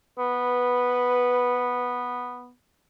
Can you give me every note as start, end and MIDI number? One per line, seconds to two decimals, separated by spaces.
0.19 2.52 59
0.19 2.06 71